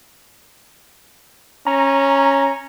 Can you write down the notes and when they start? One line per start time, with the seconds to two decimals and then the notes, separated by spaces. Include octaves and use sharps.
1.67 C#4 A#5